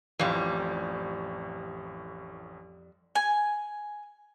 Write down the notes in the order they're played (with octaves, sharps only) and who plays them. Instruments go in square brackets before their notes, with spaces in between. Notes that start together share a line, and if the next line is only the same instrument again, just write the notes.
[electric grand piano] A1 A2 [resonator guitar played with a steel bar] F2 G3
[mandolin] G#5